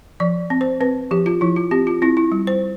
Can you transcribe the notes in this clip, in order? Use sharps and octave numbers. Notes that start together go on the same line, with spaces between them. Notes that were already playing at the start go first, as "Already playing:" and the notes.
F3 D5
C4
C5
C4 B4
F3 G4
F4
F3 E4
F4
C4 G4
F4
C4 E4
E4
G3
C5